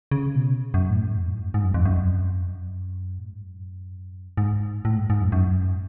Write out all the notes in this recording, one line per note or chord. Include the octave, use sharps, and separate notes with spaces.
C#3
B2
F#2
A2
G#2
F2
F#2
G#2
G#2
F#2
F2
F#2
F2
F#2
A2
G#2
F#2
G#2
A2
G#2
G#2
F#2
F#2